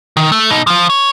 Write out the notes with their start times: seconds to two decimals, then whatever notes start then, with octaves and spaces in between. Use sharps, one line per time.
0.17 D#3
0.32 A3
0.50 B2 D#4
0.67 F3 F4
0.90 C#5